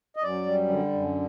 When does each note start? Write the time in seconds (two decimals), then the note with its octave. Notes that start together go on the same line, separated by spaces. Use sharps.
0.16 D#5
0.23 F#2 D5
0.46 G3
0.69 D3
0.93 F#2